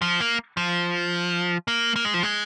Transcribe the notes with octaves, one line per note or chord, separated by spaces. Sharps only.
F3
A#3
F3
A#3
A#3
G#3
F3
G#3